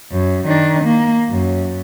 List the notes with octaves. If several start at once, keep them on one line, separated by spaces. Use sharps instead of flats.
F#2
D#3 D4
A#3
F#2